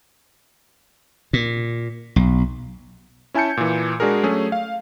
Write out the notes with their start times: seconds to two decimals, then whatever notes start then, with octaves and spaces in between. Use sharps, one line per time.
1.33 A#2
2.16 B1
3.34 C#4 E4 G#5 A5 G6 C#7
3.57 A#2 E3
4.00 G#3 D4 F#4 G#4 A#4
4.23 F#3 A3 C#4 G#4
4.52 F5